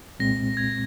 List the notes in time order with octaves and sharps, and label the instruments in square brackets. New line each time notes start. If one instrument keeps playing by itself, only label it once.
[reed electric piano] C2 A#2 G#3 C4 [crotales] A#6
[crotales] G#6